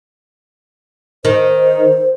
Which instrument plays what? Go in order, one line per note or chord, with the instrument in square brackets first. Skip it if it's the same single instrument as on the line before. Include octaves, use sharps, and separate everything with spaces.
[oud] D#3 [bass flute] C5